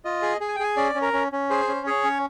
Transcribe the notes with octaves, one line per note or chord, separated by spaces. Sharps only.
F4 D#5
G#4
G#4
G#5
G5
G#4 G#5
C#4 D5
C#4
A#4
C#4
C#4
G#4 C5
C#4
G#4 C#5
C#4